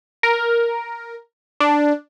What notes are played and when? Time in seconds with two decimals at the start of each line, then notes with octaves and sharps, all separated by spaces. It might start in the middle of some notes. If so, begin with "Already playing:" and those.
0.23 A#4
1.61 D4